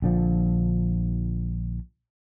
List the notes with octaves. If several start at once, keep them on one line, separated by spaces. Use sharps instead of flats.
A#1 D3 F3